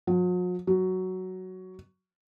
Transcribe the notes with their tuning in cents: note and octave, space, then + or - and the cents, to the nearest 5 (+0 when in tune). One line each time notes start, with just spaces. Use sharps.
F#3 -45
F#3 +10